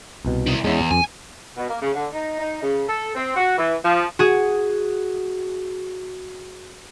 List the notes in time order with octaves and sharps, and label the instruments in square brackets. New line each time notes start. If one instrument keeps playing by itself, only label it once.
[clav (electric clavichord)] C2 B2
[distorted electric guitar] C3 E4
[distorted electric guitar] E2 [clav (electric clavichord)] G#3 C#4 E4
[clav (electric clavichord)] F2 [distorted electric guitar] G#5
[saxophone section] B2
A#3
C#3
D3
D#4
D#4
C#3
A4
C4
F#4
E3
F3
[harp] F#4 G#4